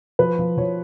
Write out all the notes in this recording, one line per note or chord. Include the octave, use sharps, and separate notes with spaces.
F3 B4
F3
F3 C#5